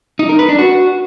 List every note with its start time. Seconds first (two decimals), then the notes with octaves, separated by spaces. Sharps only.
0.19 D#4
0.29 A#4
0.39 B4
0.49 D4
0.59 F#4